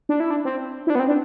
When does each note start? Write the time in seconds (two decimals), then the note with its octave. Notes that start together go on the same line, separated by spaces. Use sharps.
0.09 D4
0.20 E4
0.30 D4
0.45 C4
0.87 E4
0.90 D4
0.95 B3
1.00 C4
1.08 D4